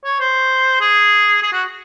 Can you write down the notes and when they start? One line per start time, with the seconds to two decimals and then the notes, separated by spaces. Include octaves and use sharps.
0.05 C#5
0.20 C5
0.81 G#4
1.42 G#4
1.52 F#4